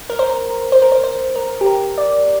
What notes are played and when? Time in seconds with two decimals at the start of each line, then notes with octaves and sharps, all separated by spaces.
0.10 A#4
0.19 C5
0.30 A#4
0.72 C5
0.82 A#4
0.92 C5
1.04 C5
1.36 A#4
1.61 G4
1.66 A#4
1.98 D5